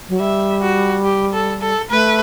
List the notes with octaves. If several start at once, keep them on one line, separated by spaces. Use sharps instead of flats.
F#3
G3 E5
F#4
G4
A4
A4
A3 B4